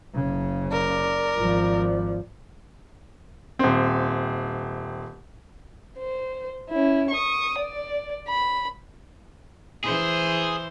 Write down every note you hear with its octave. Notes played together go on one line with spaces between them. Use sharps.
F#1 C#3
A#4 D5
G#1 F3
D#1 C4
C5
C#4 E4
C#6 D#6
D5
B5
E3 G#4 C5